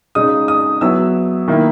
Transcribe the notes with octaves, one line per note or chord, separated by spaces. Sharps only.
C#3 G#3 D#4 D#6
D#6
F#3 B3 E4 E6
D#3 A#3 E4